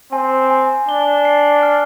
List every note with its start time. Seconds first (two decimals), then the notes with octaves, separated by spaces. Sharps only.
0.12 C4 G#5
0.51 G#5
0.88 D4 G7
1.25 C7
1.63 F6